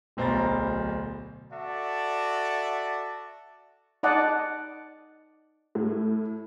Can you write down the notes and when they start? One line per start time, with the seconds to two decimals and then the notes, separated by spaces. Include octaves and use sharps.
0.17 D1 B1 C5 A#5 B5 A6
1.53 F#4 A4 D5 E5
4.03 D#4 D5 D#5 F#5 A5
5.75 A2